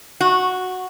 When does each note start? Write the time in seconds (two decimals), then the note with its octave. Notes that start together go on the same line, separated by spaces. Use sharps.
0.21 F#4